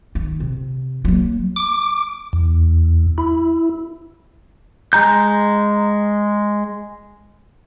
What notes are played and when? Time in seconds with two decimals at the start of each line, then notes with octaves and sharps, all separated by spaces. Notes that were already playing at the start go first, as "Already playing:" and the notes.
0.15 D#3
0.40 C3
1.05 F#3 A#3
1.56 D6
2.33 E2
3.18 E4
4.93 G#3 A#5 G6